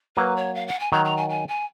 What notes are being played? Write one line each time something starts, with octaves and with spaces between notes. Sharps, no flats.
F#3 A#3 B4
C#5
F5
F#5
G#5
D#3 F#3 A#5
A#5
G#5
G#5
G#5